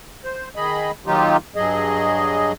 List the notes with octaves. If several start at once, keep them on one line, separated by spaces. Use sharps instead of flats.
C5
D#3 G#4 D#5 B5
D#3 F#3 A#3 D#4 F4 G4
G2 F#3 G#4 D#5